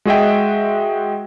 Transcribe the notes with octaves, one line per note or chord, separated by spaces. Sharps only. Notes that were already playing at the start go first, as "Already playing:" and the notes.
G#3 F#4 G#4 D#5 E5 G5